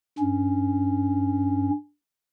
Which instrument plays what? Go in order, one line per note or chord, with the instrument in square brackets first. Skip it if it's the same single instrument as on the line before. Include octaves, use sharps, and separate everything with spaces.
[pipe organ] G2 C#4